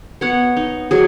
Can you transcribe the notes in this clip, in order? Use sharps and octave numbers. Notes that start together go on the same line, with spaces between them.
B3 C#5 F#5
D#4
F#3 G#4